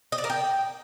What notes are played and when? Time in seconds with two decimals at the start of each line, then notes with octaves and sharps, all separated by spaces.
0.12 D#5
0.18 D5
0.24 A#4
0.30 G5